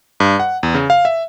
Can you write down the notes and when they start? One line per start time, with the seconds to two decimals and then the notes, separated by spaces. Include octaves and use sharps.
0.20 G2
0.40 F#5
0.63 E2
0.75 C#3
0.90 F5
1.05 E5